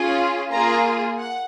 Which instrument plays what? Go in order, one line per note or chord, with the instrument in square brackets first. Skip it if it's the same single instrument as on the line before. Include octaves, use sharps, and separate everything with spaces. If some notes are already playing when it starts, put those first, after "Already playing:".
Already playing: [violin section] C#4 F4 G#4
A#3 F4 G#4 A#5
F#5